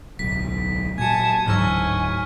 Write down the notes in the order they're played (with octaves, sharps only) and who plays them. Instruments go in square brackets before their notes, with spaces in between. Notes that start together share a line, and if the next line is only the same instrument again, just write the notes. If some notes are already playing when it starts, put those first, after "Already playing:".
[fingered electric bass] D1 B1 [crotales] B6
[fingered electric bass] A#2 F#3 [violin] G#5 A5 [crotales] G#6 C#7
[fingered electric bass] D1 [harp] G#2 F#3 E6 [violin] G#5 [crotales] C#6 F6 G#6